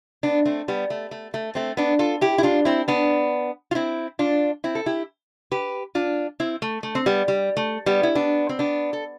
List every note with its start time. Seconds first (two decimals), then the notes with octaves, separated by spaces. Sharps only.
0.23 B3 D4
0.45 A3 C4
0.68 G3 B3
0.90 A3
1.11 A3
1.34 A3
1.55 A3 C4
1.77 B3 D4
1.99 F4 A4
2.21 E4 G4
2.38 E4
2.43 D4 F4
2.65 C4 E4
2.88 B3 D4
3.71 F4
3.75 C4 E4
4.19 D4 F4
4.64 C4 E4
4.75 A4
4.86 E4 G4
5.51 G4 B4
5.95 D4 F4
6.40 C4 E4
6.62 A3
6.83 A3
6.95 C4
7.06 G3 B3
7.28 G3
7.57 A3
7.86 G3 B3
8.03 E4
8.15 B3 D4
8.49 C4
8.59 B3 D4
8.93 A4